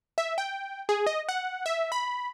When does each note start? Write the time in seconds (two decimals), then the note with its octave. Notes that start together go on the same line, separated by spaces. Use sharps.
0.18 E5
0.38 G5
0.89 G#4
1.06 D#5
1.29 F#5
1.66 E5
1.92 B5